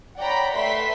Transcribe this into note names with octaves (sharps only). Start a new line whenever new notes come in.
C#5 D5 F#5 G5 A#5 B5
A3 B4 E5 C6 B6